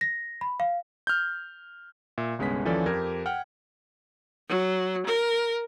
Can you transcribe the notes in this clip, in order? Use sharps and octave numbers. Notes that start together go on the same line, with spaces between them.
A#6
B5
F5
F6 G6
A#2 E5
G1 C2 G#3 B3 C#4 B6
D#2 E3 F3 C#4 A4 D5
F2 G4 A#4 G#6
F#5 G5 F6
F#3
A#4